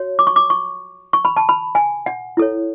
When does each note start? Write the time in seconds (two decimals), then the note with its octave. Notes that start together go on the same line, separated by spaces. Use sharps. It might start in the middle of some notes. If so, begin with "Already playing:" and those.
Already playing: F#4 C#5
0.19 D6
0.27 C#6
0.36 D6
0.50 C#6
1.13 C#6
1.25 B5
1.37 A5
1.49 B5
1.75 G#5
2.06 F#5
2.37 E4 A4 C#5